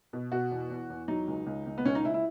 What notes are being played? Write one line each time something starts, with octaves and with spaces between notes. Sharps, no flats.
B2
B2 F#4
E2
E2
E2
F#3 D#4
C#2
C#2
C#2
B3
C#2 C#4
D#4
C#2 E4
E4